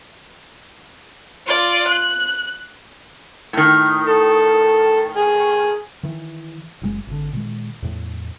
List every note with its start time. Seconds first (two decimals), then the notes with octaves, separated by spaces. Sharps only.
1.46 F4 D5
1.88 F#6
3.53 A2 D#3
4.08 A4
5.17 G#4
6.03 D#3 E3
6.82 F#1 C#3 G#3
7.07 G#1 D3
7.33 A#2 D#3 G#3
7.82 E2 A2 F3